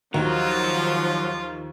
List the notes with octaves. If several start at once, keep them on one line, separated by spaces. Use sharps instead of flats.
D#2 F3 F#3 F4